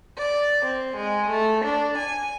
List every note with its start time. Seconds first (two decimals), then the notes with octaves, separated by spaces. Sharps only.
0.17 D5
0.65 C4
0.96 G#3
1.30 A3
1.64 D4
1.98 G#5